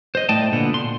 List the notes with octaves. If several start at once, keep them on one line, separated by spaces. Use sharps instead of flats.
C5 D#5
A2 A3 D5 D#5 G5 A5
A#2 D3 B3
C6